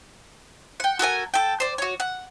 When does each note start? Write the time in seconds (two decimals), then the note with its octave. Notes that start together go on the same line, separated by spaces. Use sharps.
0.80 F#5 G5
0.99 F#4 A4 A#4 G#5
1.34 A4 G5
1.60 C5 D5
1.78 F#4 C#5
2.00 F#5